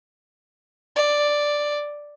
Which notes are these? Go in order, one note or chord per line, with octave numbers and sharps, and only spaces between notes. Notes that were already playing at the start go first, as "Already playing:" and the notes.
D5